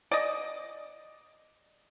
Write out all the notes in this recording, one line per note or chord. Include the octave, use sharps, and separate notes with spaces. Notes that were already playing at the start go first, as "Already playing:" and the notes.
D5 D#5